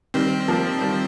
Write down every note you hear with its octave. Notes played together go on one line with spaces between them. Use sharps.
D#3 G3 C4
F3 A#3
D#3 G3